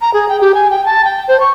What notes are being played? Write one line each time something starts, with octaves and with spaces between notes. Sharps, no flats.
A#5
G#4
G5
G4
G#5
G5
A5
G5
C5
C#6